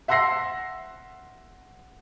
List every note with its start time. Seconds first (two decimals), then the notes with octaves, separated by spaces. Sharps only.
0.08 E5 F#5 C6 E6 A#6 C7